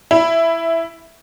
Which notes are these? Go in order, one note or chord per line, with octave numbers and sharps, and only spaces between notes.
E4